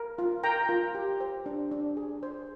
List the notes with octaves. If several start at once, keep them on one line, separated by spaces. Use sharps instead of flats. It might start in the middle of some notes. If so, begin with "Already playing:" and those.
Already playing: A#4
F4
A#4 G5 A#5
F4
G4
C5
D4
D4
G#4
C5